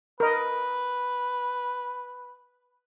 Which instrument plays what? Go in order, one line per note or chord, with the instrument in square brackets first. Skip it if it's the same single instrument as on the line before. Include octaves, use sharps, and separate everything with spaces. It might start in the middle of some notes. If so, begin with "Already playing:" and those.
[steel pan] A#4 D#5 [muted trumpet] B4